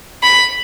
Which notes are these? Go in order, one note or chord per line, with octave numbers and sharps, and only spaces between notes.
B5